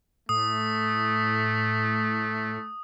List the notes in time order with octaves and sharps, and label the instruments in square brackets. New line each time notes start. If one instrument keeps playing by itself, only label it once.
[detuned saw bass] A2 [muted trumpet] A3 [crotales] D#6